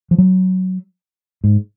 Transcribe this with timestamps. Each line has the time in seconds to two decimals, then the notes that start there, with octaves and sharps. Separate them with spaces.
0.11 F3
0.18 F#3
1.44 G#2